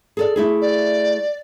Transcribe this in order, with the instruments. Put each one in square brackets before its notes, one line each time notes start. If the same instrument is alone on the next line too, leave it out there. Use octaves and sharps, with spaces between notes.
[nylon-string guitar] G#4 A4 D5
A3 E4 G#4
[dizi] D5